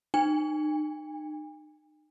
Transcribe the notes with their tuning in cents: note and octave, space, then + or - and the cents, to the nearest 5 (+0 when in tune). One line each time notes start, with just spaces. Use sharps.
D#4 -35 G#5 -45